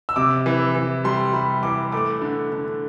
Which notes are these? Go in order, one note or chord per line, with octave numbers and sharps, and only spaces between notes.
E6
C3 D6
E3
E3
G3 C6
G3 B5
E3 D6
A3 D6
D3
D3